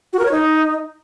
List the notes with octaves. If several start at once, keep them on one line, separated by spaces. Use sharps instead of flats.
F#4
A#4
C#5
D#4